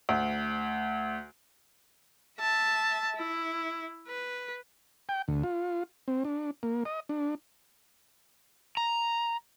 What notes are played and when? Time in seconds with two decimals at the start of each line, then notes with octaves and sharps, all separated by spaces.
0.09 D2
2.40 E5 A5
3.16 E4
4.08 B4
5.09 G5
5.28 D2
5.44 F4
6.08 C4
6.25 D4
6.63 A#3
6.85 D#5
7.09 D4
8.77 A#5